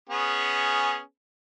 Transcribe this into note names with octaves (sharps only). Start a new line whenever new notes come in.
B3 C#4 G#4